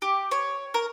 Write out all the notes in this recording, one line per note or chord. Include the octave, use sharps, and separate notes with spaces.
G4
C#5
A#4